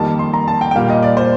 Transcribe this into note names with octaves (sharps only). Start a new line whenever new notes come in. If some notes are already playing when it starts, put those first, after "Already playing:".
Already playing: F2 D#3 G3 A#3 A5
C6
A#5
A5
G5
G5
A#2 G3 A#3 F5
D#5
D5
C5